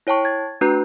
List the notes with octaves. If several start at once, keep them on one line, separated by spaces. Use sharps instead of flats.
E4 C#5 G5 A5 C#6
G#6 A6
A3 D4 F#4 B4 A#5 F#6